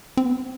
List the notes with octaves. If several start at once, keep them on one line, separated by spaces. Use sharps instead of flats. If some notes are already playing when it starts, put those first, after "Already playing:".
C4
B3